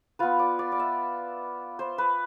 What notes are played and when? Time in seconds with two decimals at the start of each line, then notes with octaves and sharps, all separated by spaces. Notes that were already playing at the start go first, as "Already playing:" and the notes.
0.19 B3 F4 B4
0.39 D5
0.59 D5
0.72 D5
0.79 E5
1.79 C5
1.98 B4